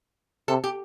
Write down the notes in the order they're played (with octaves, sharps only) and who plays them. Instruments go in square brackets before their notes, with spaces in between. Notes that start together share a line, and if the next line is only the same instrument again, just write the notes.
[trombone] C3 [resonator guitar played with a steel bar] A4
[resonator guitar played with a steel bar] G4